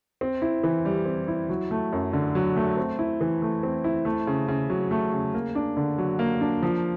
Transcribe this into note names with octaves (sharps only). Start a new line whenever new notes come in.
C4
E4
E3
G3
C4
E4
F#3
A3
F#2
D3
F#3
A3
C4
E4
E3
A3
C4
E4
A3
C#3
C#3
F#3
A3
C#3
A#3
D4
D3
F#3
A#3
D4
F3